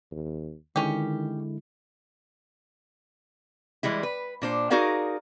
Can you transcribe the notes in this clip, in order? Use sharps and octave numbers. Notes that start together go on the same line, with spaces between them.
D#2
D3 D#3 G#3 C#4 E4 G4
E3 G3 G#3 E4
B4
A#2 D4 C5
D#4 F#4 G#4 A#4 D5 F5